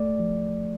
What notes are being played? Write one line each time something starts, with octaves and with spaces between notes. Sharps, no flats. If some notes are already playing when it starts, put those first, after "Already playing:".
Already playing: A3 D5
F3